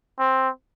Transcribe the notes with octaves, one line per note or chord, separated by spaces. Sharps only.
C4